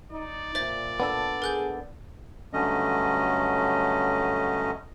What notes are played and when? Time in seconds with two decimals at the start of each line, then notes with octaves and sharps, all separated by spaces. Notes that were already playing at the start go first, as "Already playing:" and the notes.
0.12 D#4 D5
0.55 A#2 C5 E5 A6
1.00 B3 D4 A4
1.42 G#4 A#4 F#6 G6
2.53 G2 D3 F#3 A3 C#4 D#5